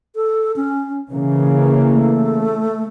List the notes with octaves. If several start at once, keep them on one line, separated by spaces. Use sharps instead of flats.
A4
C#4
C#3 E3 A#3 C#4
A3